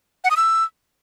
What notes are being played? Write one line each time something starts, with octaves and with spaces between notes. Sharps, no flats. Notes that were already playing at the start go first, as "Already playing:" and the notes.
F#5
D#6
E6